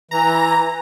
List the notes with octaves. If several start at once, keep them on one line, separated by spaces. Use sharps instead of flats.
E3 A#5